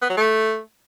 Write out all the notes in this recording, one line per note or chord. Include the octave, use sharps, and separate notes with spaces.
B3
F#3
A3